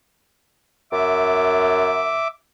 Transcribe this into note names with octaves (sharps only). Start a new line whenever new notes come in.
F#2 E5 D6